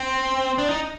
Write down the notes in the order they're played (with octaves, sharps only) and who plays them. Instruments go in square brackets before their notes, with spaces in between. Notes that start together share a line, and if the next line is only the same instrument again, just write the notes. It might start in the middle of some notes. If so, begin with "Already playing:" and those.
Already playing: [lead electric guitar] C4
D4
D#4